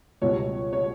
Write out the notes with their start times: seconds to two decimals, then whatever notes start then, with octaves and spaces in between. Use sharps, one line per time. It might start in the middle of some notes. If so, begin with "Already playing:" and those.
0.21 C#2 B2 G3 C#5
0.73 C#5